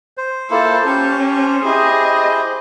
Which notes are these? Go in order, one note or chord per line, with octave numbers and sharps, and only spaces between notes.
C5
A#3 E4 F4 A4
C#4 G4 A5
E4 G4 G#4 D#5